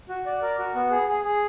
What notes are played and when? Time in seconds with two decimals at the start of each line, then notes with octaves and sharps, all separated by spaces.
0.09 F#4
0.26 D5
0.42 A#4
0.59 F#4
0.75 B3
0.91 G#4
1.08 G#4
1.24 G#4